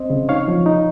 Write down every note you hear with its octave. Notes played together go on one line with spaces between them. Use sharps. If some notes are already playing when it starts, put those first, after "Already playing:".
Already playing: C4 C5 D#5
C#3
D#4 C#5 F5
F3
D#4